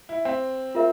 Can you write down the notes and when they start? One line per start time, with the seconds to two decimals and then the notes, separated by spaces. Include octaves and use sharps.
0.09 E4
0.25 C4
0.75 F4 A#4 E5